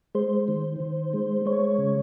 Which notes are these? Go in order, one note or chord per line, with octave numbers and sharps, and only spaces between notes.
G#3 C5
D#3
D#3
G#3
G#3 C#5
C#3